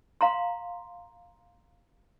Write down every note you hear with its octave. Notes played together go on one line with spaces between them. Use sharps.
F5 A#5 C6